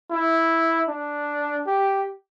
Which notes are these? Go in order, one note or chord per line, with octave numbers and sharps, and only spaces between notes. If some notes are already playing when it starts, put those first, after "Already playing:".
E4
D4
G4